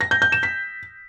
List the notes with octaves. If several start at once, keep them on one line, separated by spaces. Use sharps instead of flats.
A#6
G6
G6
E7
B6